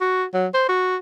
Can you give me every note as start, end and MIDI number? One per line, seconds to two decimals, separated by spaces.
0.01 0.24 66
0.34 0.47 54
0.54 0.67 72
0.69 0.96 66